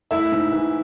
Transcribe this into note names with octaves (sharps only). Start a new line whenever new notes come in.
A3 E4 E5
G#2
E3